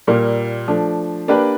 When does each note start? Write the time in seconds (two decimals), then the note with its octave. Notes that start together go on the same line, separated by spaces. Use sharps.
0.07 A#2 G3 A#3
0.68 F3 A3 D4
1.28 A#3 D4 G4 B4 D5